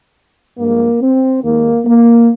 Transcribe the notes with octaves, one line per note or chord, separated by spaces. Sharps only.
G2 F3 G#3 A#3
C4
D#2 D#3 G#3 A#3
A#3